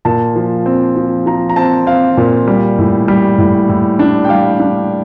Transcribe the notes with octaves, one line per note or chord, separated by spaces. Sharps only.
A#2 A5
F3
C4
F3
F3 A#5
A#5
C4 A5
C4 F5
A#2
G3
A2
G3
A2
A2
D4
G5
G3 F5
D4